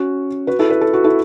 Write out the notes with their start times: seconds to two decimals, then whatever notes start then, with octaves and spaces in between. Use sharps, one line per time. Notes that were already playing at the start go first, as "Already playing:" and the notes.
Already playing: C#4 F#4
0.47 F#4 B4
0.59 E4 A4
0.70 B4
0.81 A4
0.93 F#4
1.04 E4 A4